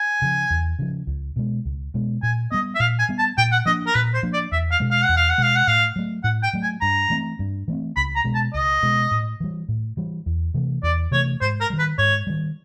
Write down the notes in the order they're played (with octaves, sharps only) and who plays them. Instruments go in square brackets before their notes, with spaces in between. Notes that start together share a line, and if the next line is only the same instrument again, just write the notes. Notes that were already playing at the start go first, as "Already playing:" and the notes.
Already playing: [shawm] G#5
[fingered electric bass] C#3 F3
E2
C#3 F3
C#2
B2 G#3
C#2
B2 G#3
[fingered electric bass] A#2 [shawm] G#5
[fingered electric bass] G3 B3 [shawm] D#5
[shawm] E5
[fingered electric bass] A#2 [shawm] F5
[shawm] G#5
[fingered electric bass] G3 B3
[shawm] A5
[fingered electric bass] A#2 [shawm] G5
[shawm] F#5
[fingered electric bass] F3 A#3 D4 [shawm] D#5
[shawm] A#4
[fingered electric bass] A#2 [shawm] B4
[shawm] C5
[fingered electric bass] F3 A#3 D4
[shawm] D5
[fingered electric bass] E2 [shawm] E5
[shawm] F5
[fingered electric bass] B2 G#3
[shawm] F5
F#5
[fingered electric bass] E2
[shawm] F5
F#5
[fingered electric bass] B2 G#3 [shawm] F5
[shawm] F#5
[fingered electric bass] A2 [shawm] F5
[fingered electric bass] F#3 A3
[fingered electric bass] A2 [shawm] F#5
[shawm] G5
[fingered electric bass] F#3 A3
[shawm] G#5
[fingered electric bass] G2 [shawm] A#5
[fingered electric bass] E3 A3 C4
G2
E3 A3 C4
[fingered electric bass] C#2 [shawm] B5
[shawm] A#5
[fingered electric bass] B2 G#3
[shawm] A5
[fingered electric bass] C#2 [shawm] D#5
[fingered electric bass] B2 G#3
A2
E3 G3
A2
E3 G3
E2
C3 E3 A3
[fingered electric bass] E2 [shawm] D5
[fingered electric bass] C3 E3 A3 [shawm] C#5
[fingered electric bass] G#2 [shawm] C5
[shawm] A#4
[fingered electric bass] D#3 G3
[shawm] B4
[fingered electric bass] G#2 [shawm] C#5
[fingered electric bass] D#3 G3